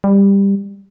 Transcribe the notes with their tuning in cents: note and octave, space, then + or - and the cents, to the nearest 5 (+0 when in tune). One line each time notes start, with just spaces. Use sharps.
G3 +15